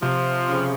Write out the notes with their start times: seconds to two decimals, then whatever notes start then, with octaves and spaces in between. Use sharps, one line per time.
0.02 C3 F3
0.48 C#3